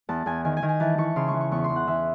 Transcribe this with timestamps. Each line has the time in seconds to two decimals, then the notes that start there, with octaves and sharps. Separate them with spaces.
0.09 E2 A5
0.26 E2 G#5
0.45 D#3 G#5
0.57 G#5
0.63 D#3
0.69 G#5
0.80 E3 A5
0.98 E3 C#6
1.16 C#3 C6
1.28 C#6
1.34 E3
1.40 C#6
1.51 E2 C#6
1.64 C6
1.69 E2
1.76 F#5
1.87 E3 E5